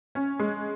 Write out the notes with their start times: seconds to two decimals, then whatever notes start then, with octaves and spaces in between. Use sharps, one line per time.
0.15 C#4
0.39 G#3